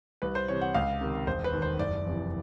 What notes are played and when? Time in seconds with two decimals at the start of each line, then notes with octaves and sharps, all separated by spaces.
0.22 C2 B4
0.35 C5
0.48 C3 E3 C#5
0.62 F#5
0.74 C#2 F5
1.01 C3 D#3
1.27 E1 C5
1.44 B4
1.53 D#2 D#3
1.62 C5
1.79 F#1 D5
2.06 F2 C3 E3